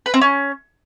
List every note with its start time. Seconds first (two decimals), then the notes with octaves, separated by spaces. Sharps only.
0.06 B4
0.14 C4
0.21 C#4